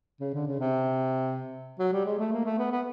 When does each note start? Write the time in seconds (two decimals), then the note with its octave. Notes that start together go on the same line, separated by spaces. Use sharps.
0.20 C#3
0.34 D3
0.47 C#3
0.60 C3
1.79 F#3
1.92 G3
2.05 G#3
2.19 A3
2.32 A#3
2.45 A3
2.58 B3
2.72 B3